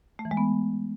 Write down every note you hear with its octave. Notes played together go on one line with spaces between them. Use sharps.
A3
E3
G#3
B3